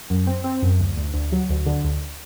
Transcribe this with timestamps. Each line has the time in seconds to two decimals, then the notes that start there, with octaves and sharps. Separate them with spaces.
0.10 F#2
0.27 C4
0.44 C4
0.62 F#2
0.80 D2
0.97 D2
1.14 D2
1.32 F#3
1.50 D2
1.66 D3
1.84 D2